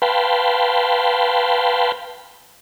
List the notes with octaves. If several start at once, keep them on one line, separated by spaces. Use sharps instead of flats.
B4 F5 G5 A5 B5 C6